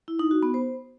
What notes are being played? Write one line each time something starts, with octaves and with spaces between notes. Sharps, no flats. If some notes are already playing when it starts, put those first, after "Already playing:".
E4
D#4
F#4
B3
C5